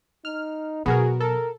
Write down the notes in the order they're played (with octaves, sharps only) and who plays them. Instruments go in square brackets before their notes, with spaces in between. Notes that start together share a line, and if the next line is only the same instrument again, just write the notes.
[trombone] D#4 [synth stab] F6
[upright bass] B2 F#3 [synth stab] B3 F#4 A#4 [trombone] G#4
[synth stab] A4 [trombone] A#4